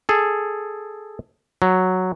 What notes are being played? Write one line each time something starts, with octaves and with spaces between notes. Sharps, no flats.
G#4 A4
F#3